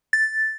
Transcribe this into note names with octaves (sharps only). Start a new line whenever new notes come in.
A6